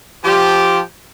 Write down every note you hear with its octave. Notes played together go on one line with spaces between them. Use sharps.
F3 G4